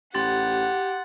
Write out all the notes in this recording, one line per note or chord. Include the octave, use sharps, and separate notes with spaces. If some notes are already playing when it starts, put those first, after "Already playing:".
A1 G4 F#5 C6 A6